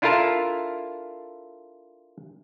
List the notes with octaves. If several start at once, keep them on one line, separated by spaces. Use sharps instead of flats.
D4 E4 F4 A4 A#4 A5